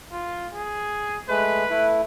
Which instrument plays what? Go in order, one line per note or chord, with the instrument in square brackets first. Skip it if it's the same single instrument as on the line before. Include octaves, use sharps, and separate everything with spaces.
[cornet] F4
G#4
[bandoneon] G#3 A3 [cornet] B4
[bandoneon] A3 E4